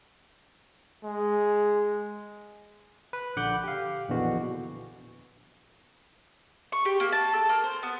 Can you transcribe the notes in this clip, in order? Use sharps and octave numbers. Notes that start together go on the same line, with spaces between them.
G#3
B4
A#1 D3 F#5 D6 F#6 G6
G4 F5
A#1 E2 B2 D3 E3 F#4
C#6
G4
A#3
A5
A4
A#3
C5
B3